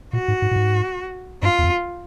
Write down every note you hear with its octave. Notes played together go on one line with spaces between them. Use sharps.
A#2 F#4
G#2
G#2
A2
G#2
G2 F4
E2
F2